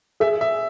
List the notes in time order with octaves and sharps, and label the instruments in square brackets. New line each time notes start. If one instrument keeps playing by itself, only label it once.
[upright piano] G#4 [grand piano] E5
[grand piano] E5